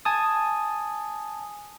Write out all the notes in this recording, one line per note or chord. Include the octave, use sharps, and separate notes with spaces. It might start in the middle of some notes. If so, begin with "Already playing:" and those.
G#5 A5 D#6